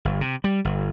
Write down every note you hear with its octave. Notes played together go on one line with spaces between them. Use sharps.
G1
C3
G3
G1